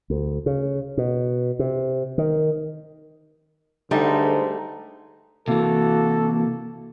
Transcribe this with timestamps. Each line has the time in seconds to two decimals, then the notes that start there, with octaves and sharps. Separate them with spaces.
0.10 D2
0.46 C#3
0.97 B2
1.59 C3
2.18 D#3
3.91 B1 G#2 D3 G3 A3 D#4
5.48 C3 E3 A#3 F#4 A4